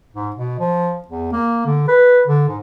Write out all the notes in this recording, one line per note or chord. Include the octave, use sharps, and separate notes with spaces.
G#2
B2
F3
E2
A#3
D3
B4
D3
G#2